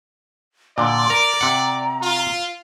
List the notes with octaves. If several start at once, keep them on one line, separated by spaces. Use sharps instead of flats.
A#2 D3 D5 C6
A#4 A#5
C3 F#5
F4